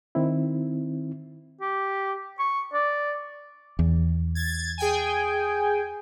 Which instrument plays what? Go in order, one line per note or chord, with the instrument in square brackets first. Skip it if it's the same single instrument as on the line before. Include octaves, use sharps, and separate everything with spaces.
[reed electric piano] D#3 C4 E4
[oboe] G4
C#6
D5
[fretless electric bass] E2
[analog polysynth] G#6 A6
G#4 G5 G#5